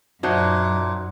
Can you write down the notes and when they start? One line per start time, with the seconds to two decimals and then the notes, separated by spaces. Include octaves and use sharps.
0.23 F#2 A#2 D#4 F#4 C5 E5 A5 G#6